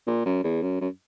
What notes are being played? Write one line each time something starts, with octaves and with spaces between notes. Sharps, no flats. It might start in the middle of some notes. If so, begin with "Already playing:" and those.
A#2
F#2
E2
F#2
F#2